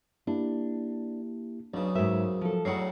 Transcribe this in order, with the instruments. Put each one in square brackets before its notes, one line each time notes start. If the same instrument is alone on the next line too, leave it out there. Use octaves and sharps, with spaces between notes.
[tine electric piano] A#3 E4 G4 [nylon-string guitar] D4
[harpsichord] B1 C#3 [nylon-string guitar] D4
[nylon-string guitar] G#2 E5 [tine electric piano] F#4 A#4 C5
[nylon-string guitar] F3 A4
[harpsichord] A2 C#3 F#3 [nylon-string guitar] A#4 D5 F#5 [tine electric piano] C7